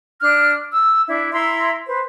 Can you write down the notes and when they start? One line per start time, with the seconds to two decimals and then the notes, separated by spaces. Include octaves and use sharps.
0.22 D4 F6 F#6
0.71 E6
1.07 D4 E4
1.33 E4 A#5 C6 E6
1.86 B4 C5